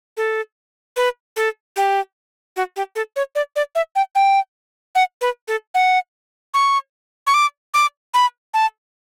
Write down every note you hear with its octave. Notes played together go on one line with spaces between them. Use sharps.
A4
B4
A4
G4
F#4
G4
A4
C#5
D5
D5
E5
G5
G5
F#5
B4
A4
F#5
C#6
C#6
D6
D6
B5
A5